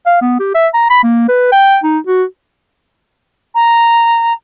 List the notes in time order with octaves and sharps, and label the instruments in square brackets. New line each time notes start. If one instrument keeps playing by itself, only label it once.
[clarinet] F5
B3
G4
E5
A#5
B5
A#3
B4
G5
D#4
F#4
[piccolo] A#5